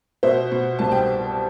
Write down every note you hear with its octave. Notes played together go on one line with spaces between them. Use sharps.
B2 C5 E5
B2
C2 A5
G5